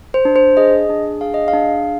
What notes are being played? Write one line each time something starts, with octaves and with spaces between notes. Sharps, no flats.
C5
D4
C5
G#4 D#5
D4
G#4 F5
D#5
F5
D4